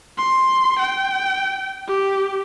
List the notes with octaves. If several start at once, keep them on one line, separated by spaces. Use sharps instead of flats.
C6
G5
G4